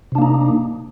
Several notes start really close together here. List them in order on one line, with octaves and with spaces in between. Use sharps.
C3 D4 A#3 D#4